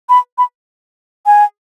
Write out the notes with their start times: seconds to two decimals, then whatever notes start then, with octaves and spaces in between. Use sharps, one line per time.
0.09 B5
0.38 B5
1.26 G#5